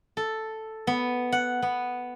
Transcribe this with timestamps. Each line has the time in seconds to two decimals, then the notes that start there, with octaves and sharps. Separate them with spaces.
0.17 A4
0.87 B3
1.32 F#5
1.62 B3